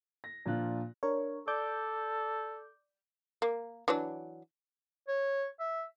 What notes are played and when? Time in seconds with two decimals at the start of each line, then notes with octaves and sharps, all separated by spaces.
0.24 A#6
0.46 A#2 F3 D4 F4 F#6
1.03 D4 A#4 C#5
1.48 A4 D5 D6 G6
3.42 A#3
3.88 E3 F#3 D4
5.08 C#5
5.59 E5